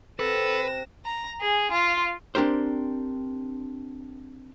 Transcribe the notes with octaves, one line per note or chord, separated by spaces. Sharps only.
C3 A4 B4 F#5 A#6 E7
A#5
G#4
F4
C4 D4 G4 A#4 C5